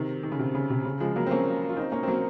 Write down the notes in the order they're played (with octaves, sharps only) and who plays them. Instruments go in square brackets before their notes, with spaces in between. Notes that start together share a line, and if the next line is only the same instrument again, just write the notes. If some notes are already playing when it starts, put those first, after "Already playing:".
Already playing: [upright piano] C3 D#3
D#3
C#3
C3
C#3
C3
C#3
F3 G#3
F#3 A#3
C4
A#3 C#4
F4
C4 D#4
A#3 C#4
C4
F#3 A#3